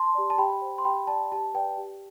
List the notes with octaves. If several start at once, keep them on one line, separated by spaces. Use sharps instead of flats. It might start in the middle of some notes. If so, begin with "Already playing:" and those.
Already playing: A5 C6
G4 D5
A5
G4 G5 B5
C5
C6
G4 G5 B5
D5 A5
G4 A5
B4 D5 G5
G4